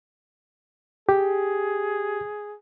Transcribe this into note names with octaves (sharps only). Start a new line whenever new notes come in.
G4 G#4